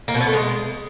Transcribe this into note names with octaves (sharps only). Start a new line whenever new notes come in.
A#3
B2
B3
A3
G#3